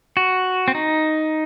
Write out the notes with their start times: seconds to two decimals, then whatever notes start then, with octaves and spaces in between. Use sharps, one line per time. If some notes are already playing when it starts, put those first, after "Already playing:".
0.17 F#4
0.68 C4
0.75 D#4